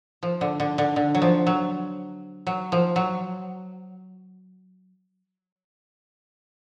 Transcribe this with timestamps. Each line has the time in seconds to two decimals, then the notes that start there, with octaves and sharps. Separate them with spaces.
0.23 F3
0.41 D3
0.60 D3
0.78 D3
0.96 D3
1.15 F#3
1.22 F3
1.47 F#3
2.47 F#3
2.72 F3
2.96 F#3